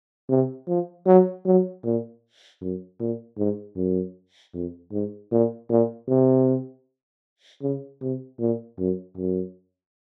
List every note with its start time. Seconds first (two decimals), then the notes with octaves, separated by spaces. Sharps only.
0.30 C3
0.68 F3
1.06 F#3
1.46 F#3
1.84 A#2
2.61 F#2
3.00 A#2
3.38 G#2
3.76 F#2
4.54 F2
4.92 G#2
5.31 A#2
5.70 A#2
6.08 C3
7.62 C#3
8.01 C3
8.40 A#2
8.78 F#2
9.17 F#2